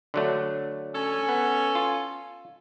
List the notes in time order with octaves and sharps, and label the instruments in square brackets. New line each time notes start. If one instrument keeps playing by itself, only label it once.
[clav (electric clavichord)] D3 F#3 A3
[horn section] C#4 A4 G#5
[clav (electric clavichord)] B3
F4